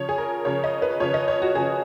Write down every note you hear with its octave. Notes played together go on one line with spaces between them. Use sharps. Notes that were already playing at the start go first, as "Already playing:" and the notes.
Already playing: C#3 F3 C#5
G#4
A#4
C#3 F3 C#5
D#5
B4
C#3 F3 C#5
D#5
C#5
F#4
C#3 F3 G#4